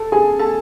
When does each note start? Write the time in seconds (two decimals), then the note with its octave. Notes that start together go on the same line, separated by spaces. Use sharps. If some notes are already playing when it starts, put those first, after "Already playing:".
Already playing: A4 A5
0.12 G#4 G#5
0.39 A4 A5